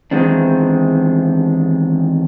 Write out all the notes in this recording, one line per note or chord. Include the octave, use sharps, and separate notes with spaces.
E2 G#2 D#3 G#3 C4 D4